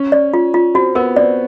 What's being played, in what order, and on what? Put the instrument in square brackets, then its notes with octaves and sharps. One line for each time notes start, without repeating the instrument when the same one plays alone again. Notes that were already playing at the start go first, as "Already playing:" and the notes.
Already playing: [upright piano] C#4
[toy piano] D5
F4
F4
[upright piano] C4 [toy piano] F#4
[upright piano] B3 [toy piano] A#4
[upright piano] C4 [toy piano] D5